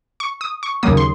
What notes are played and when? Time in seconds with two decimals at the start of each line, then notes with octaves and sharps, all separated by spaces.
0.20 C#6
0.41 D#6
0.63 C#6
0.83 D#2 C#3 F#3 A#3 D#6
0.97 C6